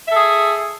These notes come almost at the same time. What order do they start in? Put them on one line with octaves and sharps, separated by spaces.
E5 A4 G#4